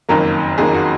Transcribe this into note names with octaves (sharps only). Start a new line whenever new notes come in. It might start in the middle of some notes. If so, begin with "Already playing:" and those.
F#1 F2 D#3 F#3 A#3 A#4
F#1 F2 D#3 F#3 A#3 G#4
F#4